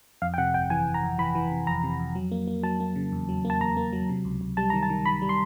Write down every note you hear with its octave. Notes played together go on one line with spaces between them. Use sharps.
F2 F5
G5
C3 F#5
G1 G5
E3 G#5
G1
A#5
F2
E3 B5
E3
C3
F2 A#5
C3
F2
F#3
A#3
A#3
F#3 A5
A#3
C#3
E2
F#3
A#3
A5
E2 A#5
A#3
F#3
C3
C#2
C#2
G3 A5
D#3 A#5
A5
D#3
D#3 B5
G3
C6